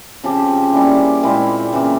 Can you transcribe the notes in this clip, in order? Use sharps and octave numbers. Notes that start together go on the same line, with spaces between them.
C#3 F3 C4 G4
G3 A#3 C#4 E4
A#2 G#3 C4 E4
C#3 E3 A#3